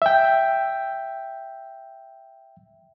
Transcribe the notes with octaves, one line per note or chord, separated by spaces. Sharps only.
E5 G5